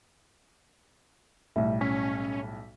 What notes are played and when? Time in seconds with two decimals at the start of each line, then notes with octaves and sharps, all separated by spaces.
1.56 B1 A2 G3 E5
1.81 C#4 B6